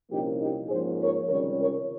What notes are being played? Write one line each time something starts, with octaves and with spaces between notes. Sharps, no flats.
C2 A#2 F3 A#3 C#4 D#4 G4
D#4 G4
G#2 F3 A#3 C#4 G#4 C5
A#4 C#5
C#2 C3 D#3 G3 C#4 A#4 C#5
A#4 C#5